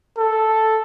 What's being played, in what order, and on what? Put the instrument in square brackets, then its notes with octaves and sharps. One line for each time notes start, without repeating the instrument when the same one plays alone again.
[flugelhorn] A4